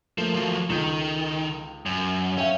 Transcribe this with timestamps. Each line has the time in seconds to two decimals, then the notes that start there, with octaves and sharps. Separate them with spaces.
0.18 F3 A3 A#3
0.34 F3 F#3
0.70 C#2 D#3 A4 G6
1.86 F#2
2.38 C#4 E5 F5 G5